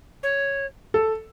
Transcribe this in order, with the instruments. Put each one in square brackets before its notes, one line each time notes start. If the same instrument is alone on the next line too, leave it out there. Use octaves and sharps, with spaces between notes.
[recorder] C#5
[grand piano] A4